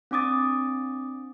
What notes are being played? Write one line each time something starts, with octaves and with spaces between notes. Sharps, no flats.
C4 D4 D6 D#6 A6